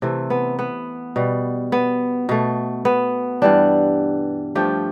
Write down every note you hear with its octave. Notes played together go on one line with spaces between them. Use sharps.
C3 E3 A3
B3
B3
B2 G3
B3
B2 A3
B3
G2 E3 G3 D4
G2 F3 A3 G4